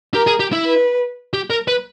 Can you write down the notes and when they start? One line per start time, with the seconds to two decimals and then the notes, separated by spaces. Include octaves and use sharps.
0.14 G4 A#4
0.27 G#4
0.40 G4
0.52 E4
0.66 B4
1.33 G4
1.50 A#4
1.68 B4